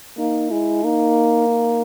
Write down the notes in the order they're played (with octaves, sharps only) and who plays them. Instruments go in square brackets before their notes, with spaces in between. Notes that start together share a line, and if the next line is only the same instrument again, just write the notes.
[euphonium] A#3 [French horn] D#4
[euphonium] G#3 [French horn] E4
[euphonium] A#3 [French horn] D#4
[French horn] D#4